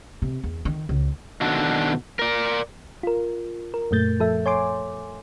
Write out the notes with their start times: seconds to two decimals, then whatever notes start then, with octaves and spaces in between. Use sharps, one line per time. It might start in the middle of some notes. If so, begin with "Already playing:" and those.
0.22 C3
0.44 E2
0.65 D#3
0.89 C#2
1.41 B2 D#3 D4 F#4 A4
2.19 A#4 D5
3.03 F4 A#4
3.74 A#4
3.91 F#2 A#2 A3 G6 A6
4.20 F3 A4 E5
4.46 C#5 G#5 C6 D6